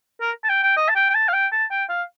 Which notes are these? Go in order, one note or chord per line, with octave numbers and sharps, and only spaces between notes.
A#4
A5
G5
G5
D#5
A5
G5
G5
A5
F5
G5
A5
G5
F5